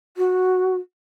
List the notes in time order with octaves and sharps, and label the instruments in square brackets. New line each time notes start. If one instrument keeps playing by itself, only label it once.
[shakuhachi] F#4